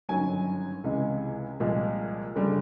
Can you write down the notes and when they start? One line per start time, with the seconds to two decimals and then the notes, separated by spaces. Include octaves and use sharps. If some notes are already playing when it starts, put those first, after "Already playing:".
0.09 G1 F#2 D#3 F#3 G#5
0.84 C#2 C3 E3 G#3
1.60 C2 A#2 F3 G#3
2.36 F#1 F#2 D3 G3